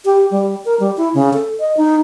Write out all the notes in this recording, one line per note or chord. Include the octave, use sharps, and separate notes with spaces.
G4
G3
A#4
G3
E4
C#3
A4
D#5
D#4